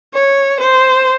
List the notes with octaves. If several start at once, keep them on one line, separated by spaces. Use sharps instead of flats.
C#5
C5